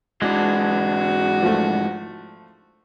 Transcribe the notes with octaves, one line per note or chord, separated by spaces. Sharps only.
G#2 E3 G#3 D4 F#4
F3 A3